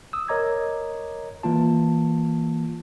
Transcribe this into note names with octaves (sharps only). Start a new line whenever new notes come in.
D#6 E6
A#4 C#5 D#5 A#5 D6 G#6
E3 A#3 F4 A5